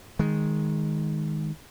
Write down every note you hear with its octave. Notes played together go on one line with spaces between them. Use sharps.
D#3 G#3